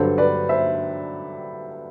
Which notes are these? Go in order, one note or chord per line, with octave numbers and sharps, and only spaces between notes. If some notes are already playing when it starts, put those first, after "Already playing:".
Already playing: G2 D3 F#3 A4 C5
B4 D5
C5 E5